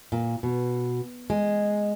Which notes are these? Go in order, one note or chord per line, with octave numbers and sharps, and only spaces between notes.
A#2
B2
G#3